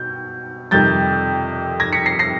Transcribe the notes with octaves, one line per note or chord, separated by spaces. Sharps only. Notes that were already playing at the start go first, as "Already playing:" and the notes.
Already playing: B2 G6
F2 C3 D#3 G3 G6 A6
G#6 A#6
B6 C#7
A#6 C7
A#6 C7